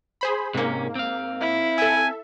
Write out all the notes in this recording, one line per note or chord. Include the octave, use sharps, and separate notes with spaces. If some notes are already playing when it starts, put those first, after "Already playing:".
G#4 C5 B5
G#2 C3 A#3 C#4
C4 F5
E4
A4 E5 G#5